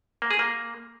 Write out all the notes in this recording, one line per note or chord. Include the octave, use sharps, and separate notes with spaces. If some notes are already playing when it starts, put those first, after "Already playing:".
A#3
G#4
A#3